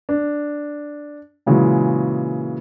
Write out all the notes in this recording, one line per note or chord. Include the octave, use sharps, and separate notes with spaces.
D4
A#2 C#3 E3 F#3 G#3